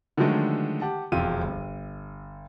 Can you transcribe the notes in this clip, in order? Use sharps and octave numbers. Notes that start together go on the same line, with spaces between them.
D3 D#3 F3 F#3 G#3 A3
G4 F#5 A5
E1 F2 C3 F4 E6 D#7
G1